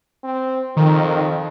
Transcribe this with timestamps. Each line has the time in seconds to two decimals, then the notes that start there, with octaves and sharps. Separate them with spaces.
0.23 C4
0.76 F2 D#3